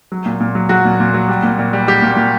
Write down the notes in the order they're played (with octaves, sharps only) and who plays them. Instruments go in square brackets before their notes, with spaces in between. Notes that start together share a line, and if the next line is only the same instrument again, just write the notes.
[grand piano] F#3
A#2
A#2
F#3
F#3 F#4
A#2
A#2
F#3
G3
A#2
A#2
G3
G3 G4
A#2
A#2